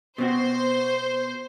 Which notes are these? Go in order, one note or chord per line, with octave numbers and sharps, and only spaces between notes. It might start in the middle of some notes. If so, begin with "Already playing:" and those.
B2 C4 F#4 C5